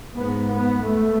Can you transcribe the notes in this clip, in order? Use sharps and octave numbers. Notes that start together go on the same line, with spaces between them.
G#2 B3
B3
A3